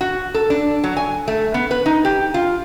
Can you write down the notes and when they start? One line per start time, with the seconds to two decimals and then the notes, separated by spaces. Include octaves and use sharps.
0.01 F#4
0.34 A4
0.50 D4
0.84 F#3
0.97 G#5
1.28 A3
1.54 B3
1.71 B4
1.86 D#4
2.05 G4
2.34 F4